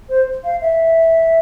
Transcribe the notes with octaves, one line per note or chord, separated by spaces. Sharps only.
C5
F5
E5